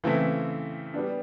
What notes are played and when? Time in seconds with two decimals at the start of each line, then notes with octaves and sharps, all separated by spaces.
0.04 C#3 E3 A3 C4 E4
0.94 G3 B3 D4